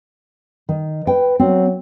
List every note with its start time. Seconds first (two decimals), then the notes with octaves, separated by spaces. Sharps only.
0.69 D#3
1.07 B4 G5
1.39 F#3 C4